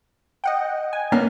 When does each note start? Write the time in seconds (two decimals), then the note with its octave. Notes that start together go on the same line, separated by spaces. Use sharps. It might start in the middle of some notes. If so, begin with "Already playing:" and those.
0.44 D#5 F#5 G5
0.93 G#5
1.12 A#3 B3 C#4